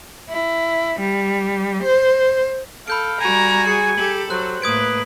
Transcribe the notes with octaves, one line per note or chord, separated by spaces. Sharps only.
E4
G3
C5
A4 F5 B5 G6 D7
G3 F#4 G#5 A#5
G#4 C#7
G4 A4 F#7
F#3 C5 F#6
A2 A#3 B4 D#6 G#6 D7